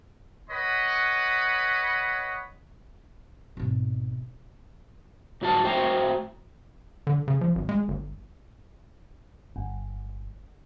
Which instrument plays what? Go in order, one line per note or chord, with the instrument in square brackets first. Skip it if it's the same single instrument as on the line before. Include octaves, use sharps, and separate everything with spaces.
[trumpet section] B4 C#5 D#5 F#5 B5
[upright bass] G#1 B2
[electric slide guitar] G#2 F#3 F#4 A4 A5
A2 F#4 C5 G5 G#5 A#5
[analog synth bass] D3
C#3
F3
G#1
G#3
G1
[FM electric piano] G1